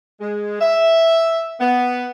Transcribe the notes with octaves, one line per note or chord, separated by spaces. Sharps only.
G#3
E5
B3